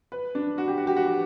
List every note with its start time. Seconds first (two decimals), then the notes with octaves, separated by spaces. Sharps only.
0.12 B4
0.35 D4
0.58 F#4
0.68 G4
0.78 F#4
0.87 G4
0.97 F#4
1.06 G4